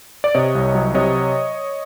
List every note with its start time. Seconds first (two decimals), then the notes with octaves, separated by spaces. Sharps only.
0.24 D5
0.35 C3 C#5 D#5
0.55 C2
0.75 F#3
0.94 C3 C#5 D#5